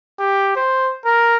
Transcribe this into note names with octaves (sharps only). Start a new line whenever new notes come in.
G4
C5
A#4